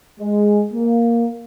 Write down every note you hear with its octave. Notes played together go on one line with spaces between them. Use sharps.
G#3
A#3